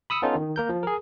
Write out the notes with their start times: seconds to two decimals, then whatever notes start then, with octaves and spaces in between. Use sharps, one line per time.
0.10 B5 D#6 E6 C#7
0.22 B3 C#4 D#4 F4 A4
0.35 D#3
0.56 A#3 A#4 G6
0.69 F3
0.83 G#4 A#4